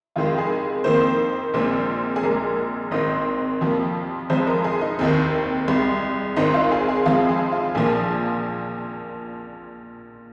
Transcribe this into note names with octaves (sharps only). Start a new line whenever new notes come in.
F2 C3 D#3 G#3 F4
G#4
F2 D#3 A#3 C5
A#1 A#2 G#3 C4
G#4
A#1 A#2 G#3 A#4
G#1 G#2 D#3 C4 D#5
F2 C3 F3 A#3
F1 F2 F3 G#3 C5
A#4
G#4
D#4
F1 D#2 D#3 C4
C2 C3 G#3
G#1 G#2 D#3 C4 D#4
F4
G#4
G#4
F2 F3 G#3 C4 F4
G#4
F4
A#1 A#2 F3 A#3 G#4